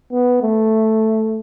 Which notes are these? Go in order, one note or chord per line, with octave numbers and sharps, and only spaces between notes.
B3
A3